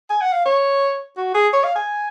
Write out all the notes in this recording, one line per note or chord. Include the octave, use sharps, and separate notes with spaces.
G#5
F#5
F5
C#5
F#4
G#4
C#5
F5
G#5